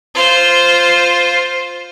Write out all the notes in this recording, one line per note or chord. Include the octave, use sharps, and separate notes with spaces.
F4 C5